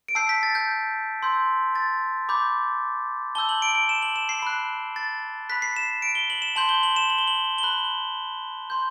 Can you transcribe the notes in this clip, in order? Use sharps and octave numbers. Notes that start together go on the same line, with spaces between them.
D7
A5 E6 G6 C7
B6
A6
G6
C6 E6 G6
A6
B5 D6 G6
A5 E6 G6 G7
F#7
D7
D7
E7
F#7
E7
C7
B5 F#6
A6
B5 F#6 B6
C7
E7
D7
G7
F#7
E7
A5 C6 G6 F#7
G7
F#7
E7
F#7
G7
F#7
G7
B5 F#6 F#7
C6 G6